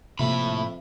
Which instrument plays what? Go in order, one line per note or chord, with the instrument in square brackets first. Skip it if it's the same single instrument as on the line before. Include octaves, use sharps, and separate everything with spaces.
[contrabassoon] F2 [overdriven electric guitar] A2 B5 [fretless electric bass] C3 A#3 [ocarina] E5